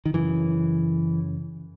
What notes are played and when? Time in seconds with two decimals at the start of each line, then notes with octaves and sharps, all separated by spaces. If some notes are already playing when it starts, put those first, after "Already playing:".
0.05 D#3
0.14 F#2 C#3 E3